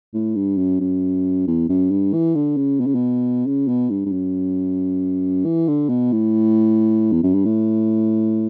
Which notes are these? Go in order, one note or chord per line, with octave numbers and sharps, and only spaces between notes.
A2
G2
F#2
F#2
E2
F#2
G2
E3
D3
C#3
B2
C#3
B2
C#3
B2
G2
G2
F#2
E3
D3
B2
A2
E2
F#2
G2
A2